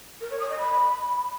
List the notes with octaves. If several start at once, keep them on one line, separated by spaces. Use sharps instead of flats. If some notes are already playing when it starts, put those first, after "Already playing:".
A#4
C#5
D#6
D#5
B5